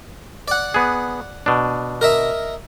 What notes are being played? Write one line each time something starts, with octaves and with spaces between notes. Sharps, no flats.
D5 F#5
B3 G#4
B2 D4
A#4 D#5 E5